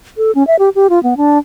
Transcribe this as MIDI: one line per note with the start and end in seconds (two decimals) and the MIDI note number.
0.17 0.31 69
0.35 0.45 61
0.47 0.56 76
0.59 0.69 67
0.75 0.87 67
0.90 1.02 65
1.03 1.17 59
1.17 1.38 62